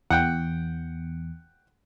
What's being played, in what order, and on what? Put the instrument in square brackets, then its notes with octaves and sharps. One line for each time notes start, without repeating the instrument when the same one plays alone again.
[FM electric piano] E2 [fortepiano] F#5 G5